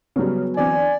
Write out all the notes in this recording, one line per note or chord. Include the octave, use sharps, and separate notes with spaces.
C#3 F#3 G3 B3
D3 E3 C4 D5 G#5